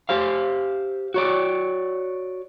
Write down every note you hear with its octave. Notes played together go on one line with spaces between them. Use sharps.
G4 C5 F5
F#4 C#5 D5